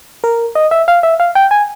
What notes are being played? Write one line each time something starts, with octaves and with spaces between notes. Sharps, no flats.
A#4
D#5
E5
F5
E5
F5
G5
G#5